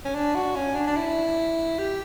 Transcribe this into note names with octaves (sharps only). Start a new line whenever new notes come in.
C#4
D4
F#4
C#4
D4
D4
E4
G4